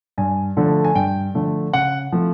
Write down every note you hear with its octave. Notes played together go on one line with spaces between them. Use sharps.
G2 G#5
D3 F3 A3
G#5
G2 G5
D3 F3 A3
C#3 F#5
F3 A3 C4